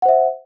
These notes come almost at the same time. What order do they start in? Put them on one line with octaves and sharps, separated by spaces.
F#5 C5 E5